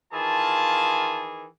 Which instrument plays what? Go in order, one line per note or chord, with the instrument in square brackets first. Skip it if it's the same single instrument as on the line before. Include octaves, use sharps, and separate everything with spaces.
[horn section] D#3 E3 G#4 [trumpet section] F4 A5